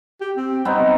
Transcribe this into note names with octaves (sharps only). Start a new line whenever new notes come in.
G4
C4
G3 B3 C4 D#4
F#3